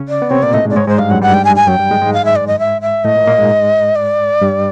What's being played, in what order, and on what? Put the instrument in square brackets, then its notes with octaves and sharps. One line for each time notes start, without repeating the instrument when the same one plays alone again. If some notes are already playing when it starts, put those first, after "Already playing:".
Already playing: [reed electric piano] C#3 C#4
[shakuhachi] D5
[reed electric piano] B3
[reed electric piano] C3 C4 [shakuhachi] C#5
[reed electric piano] A#2 A#3 [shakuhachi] D5
[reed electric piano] A2 A3 [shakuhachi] D#5
[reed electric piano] G#2 G#3
[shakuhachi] D5
[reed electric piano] G#2 G#3 [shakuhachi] C#5
[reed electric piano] G#2 G#3 [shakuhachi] C5
[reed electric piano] G2 G3 [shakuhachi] F5
[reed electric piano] F#2 F#3 [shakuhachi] F#5
[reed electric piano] G2 G3 [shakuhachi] F#5
[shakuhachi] G5
G#5
G#5
[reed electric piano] F#2 F#3 [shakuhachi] G5
[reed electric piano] G2 G3
G#2 G#3
G#2 G#3
[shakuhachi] F5
E5
D5
D#5
E5
E5
[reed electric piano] A2 A3 [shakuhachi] D#5
[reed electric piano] A#2 A#3
A#2 A#3
G#2 G#3
[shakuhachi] D5
[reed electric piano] G2 G3